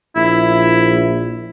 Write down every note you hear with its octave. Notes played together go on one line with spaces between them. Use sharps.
A#1 E4